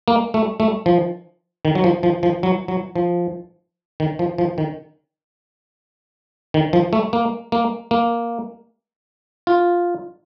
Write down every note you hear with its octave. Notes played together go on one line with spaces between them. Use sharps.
A#3
A3
A3
F3
D#3
F#3
F3
F3
F3
F#3
F#3
F3
D#3
F3
F3
D#3
D#3
F3
A3
A#3
A#3
A#3
F4